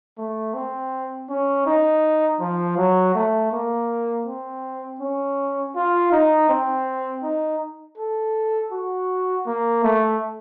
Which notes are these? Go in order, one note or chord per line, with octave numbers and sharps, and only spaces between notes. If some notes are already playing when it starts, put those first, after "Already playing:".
A3
C4
C#4
D#4
F3
F#3
A3
A#3
C4
C#4
F4
D#4
C4
D#4
A4
F#4
A#3
A3